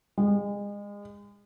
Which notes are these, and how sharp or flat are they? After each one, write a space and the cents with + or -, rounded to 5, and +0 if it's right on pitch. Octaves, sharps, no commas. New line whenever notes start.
G#3 -30